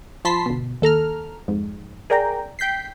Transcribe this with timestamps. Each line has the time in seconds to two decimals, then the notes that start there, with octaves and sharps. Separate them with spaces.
0.25 F3 A5 B5 C6 B6 C7
0.46 G1 B2
0.82 D#2 A4 A#5 F6
1.48 F2 G#2
2.10 G#4 A#4 D5 G5 A#5
2.59 G5 G6 B6 C7